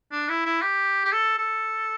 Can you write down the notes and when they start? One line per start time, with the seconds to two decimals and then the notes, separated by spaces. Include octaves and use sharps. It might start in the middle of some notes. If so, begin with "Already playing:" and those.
0.12 D4
0.29 E4
0.46 E4
0.62 G4
1.05 G4
1.12 A4
1.38 A4